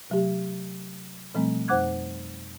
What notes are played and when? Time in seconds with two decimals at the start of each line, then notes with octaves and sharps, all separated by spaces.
0.10 C3 F#3 A3 G4
1.34 B2 F3 G3 A3 C4
1.68 F2 C5 F#5 D6 F#6 G#6